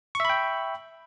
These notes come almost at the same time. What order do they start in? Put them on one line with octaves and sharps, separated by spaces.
C#6 E5 B5 G5